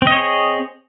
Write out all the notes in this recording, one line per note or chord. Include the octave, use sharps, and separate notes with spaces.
C4 G#4 C#5 D#5